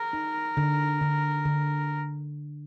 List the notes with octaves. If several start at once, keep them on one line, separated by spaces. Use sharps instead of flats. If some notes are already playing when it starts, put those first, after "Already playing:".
Already playing: G#4 A#4
D#4
D3
D3
D3